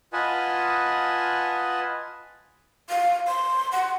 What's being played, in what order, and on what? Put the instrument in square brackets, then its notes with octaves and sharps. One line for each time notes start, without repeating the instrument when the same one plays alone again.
[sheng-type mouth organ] F4 B4 D#5 F#5 G#5 A5
[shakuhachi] F5
C6
F#5